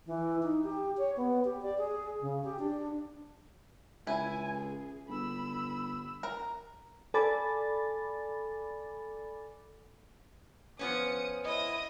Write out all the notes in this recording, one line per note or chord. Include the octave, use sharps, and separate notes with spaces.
E3
D#4
G4
C#5
B3
G4
D5
G#4
C#3
G4
D4
C#2 E4 G#5
G#4
G1 B5 E6
A#4 A#5
A4 D5 G#5 B5 D6 A6
F3 B3 C#4 D#6 C#7
E4 D#5 D#6